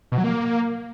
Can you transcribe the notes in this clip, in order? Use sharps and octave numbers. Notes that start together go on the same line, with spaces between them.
B2
F#3
A#3